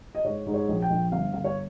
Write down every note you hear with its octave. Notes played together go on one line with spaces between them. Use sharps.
D#5
G#2 C#5
G#2
C#5
A#1
G5
A#1
G1 F5
G1 F5
C#5